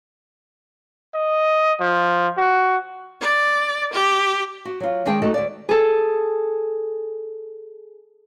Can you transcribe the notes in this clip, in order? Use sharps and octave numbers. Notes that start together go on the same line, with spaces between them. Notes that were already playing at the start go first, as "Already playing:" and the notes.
D#5
F3
F#4
D5
G4
F#4
F#3 F4
D#3 G#3 D4 G#4 G5
A3 D#4 F#4 A4 D#5
D2 D5
G#4 A4